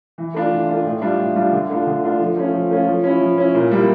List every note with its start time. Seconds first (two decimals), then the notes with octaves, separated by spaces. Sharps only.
0.18 E3
0.34 A3 D4 F4
0.52 E3
0.68 A3 D4 F4
0.85 A2
1.02 G3 D4 F4
1.20 A2
1.35 G3 D4 F4
1.52 D3
1.70 A3 D4 F4
1.87 D3
2.04 A3 D4 F4
2.20 F3
2.36 A3 C#4 F4
2.53 F3
2.71 A3 C#4 F4
2.87 F3
3.04 C#4 E4
3.21 F3
3.38 C#4 E4
3.55 A#2
3.71 G3 A#3 E4